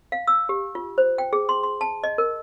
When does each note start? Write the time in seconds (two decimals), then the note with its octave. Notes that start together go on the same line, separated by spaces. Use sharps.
0.12 F5
0.27 E6
0.49 G4
0.75 F4
0.98 C5
1.18 G5
1.33 G#4
1.49 C6
1.63 C6
1.81 A5
2.04 D#5
2.18 A#4